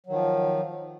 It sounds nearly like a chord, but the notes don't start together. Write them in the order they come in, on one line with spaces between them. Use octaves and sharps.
F#3 D#3 F3